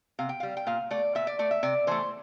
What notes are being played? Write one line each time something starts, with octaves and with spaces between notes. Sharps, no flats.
C3 F5
G5
G3 F5
G5
A#2 F5
A3 D5
A#2 E5
D5
A3 D5
E5
C3 D5
E3 A3 C5